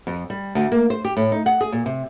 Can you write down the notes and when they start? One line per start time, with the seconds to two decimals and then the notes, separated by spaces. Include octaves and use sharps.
0.07 F2
0.30 G3
0.55 D2
0.72 A#3
0.90 C5
1.05 G4
1.17 A2
1.32 D#4
1.46 F#5
1.61 G#4
1.72 A#2
1.86 C3